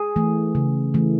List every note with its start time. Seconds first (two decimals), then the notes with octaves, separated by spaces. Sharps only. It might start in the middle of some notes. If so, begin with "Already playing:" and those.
Already playing: G#4
0.16 E3 A3
0.55 C#3
0.94 E3 A3